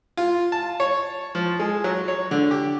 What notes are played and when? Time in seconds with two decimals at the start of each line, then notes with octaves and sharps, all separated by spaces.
0.17 F4
0.52 A5
0.80 C#5
1.35 F3
1.60 G#3
1.84 F#3
2.08 C#5
2.31 D3
2.51 G4